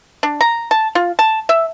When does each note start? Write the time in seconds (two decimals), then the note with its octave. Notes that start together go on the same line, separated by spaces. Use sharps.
0.23 D4
0.41 A#5
0.71 A5
0.95 F4
1.19 A5
1.49 E5